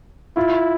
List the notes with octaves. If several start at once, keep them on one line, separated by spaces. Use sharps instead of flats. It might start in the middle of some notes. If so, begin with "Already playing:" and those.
E4 F4